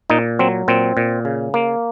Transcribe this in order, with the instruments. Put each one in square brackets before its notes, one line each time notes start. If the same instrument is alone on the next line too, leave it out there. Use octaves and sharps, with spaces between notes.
[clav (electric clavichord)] A#2 D#4
F#3 C4
A#2 C4
A#2
C#3
A#3